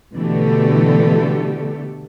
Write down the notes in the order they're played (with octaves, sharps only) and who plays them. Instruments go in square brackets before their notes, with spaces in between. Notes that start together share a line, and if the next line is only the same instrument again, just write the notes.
[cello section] B2 D3 E3 A3 G4 A4